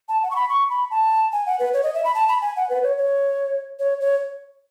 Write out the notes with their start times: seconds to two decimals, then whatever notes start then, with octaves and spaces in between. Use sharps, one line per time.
0.09 A5
0.23 F#5
0.31 C#6
0.36 B5
0.49 C#6
0.70 B5
0.91 A5
1.32 G#5
1.46 F#5
1.59 B4
1.74 C#5
1.83 D#5
1.94 E5
2.04 B5
2.15 A5
2.28 B5
2.42 G#5
2.56 F#5
2.70 B4
2.83 C#5
2.98 C#5
3.79 C#5
4.00 C#5